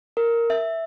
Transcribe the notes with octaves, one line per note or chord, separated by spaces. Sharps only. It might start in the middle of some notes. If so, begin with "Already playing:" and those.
A#4
E5